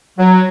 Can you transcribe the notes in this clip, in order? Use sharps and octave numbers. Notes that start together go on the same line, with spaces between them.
F#3